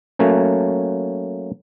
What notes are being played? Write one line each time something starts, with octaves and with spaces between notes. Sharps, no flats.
F#3 A3 A#3 C#4